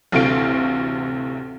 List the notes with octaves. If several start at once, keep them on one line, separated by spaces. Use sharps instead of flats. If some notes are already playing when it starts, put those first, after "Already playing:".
A1 D2 C3 A3 F5 D7